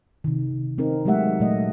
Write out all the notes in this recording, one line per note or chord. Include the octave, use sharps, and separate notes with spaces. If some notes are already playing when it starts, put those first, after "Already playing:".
C3 D#3
C4 D#4 A#4
F#3 G#3 A3 G4 E5 F#5
A#2 F#3 A3 D#5